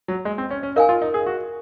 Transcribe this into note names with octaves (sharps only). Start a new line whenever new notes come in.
F#3
G#3
C4
C#4
C#4
D#4 A#4 F5 G#5
F4
D#4
G#4
F#4